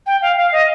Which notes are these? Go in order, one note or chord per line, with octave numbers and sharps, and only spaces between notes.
G5
F5
F5
D#5